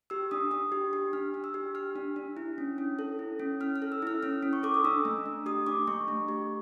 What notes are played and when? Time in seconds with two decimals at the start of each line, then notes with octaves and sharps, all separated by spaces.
0.10 G4 E6
0.31 D4 D#6
0.51 D4 D#6
0.72 G4
0.93 G4
1.13 D4 F6
1.34 D4
1.44 E6
1.54 G4
1.75 G4 F6
1.96 D4
2.16 D4
2.37 E4
2.58 C#4
2.78 C#4
2.99 A4
3.19 E4
3.40 C#4
3.61 C#4 F6
3.76 F6
3.82 A4
3.92 E6
4.02 E4 F6
4.23 C#4 F6
4.43 C#4
4.53 C#6
4.63 A4 D6
4.74 D#6
4.84 D4 E6
5.05 A3
5.26 A3
5.46 G4 D#6
5.67 D4 D6
5.87 A3 C#6
6.08 A3
6.29 G4